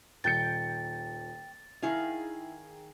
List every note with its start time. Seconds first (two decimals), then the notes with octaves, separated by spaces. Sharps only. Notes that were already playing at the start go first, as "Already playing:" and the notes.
0.24 D#1 G5 G6 A6 C#7
1.83 D#3 E4 G#4 F5